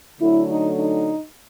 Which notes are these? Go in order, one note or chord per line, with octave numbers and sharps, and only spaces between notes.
D3 F#3 A3 E4
D#4
D#4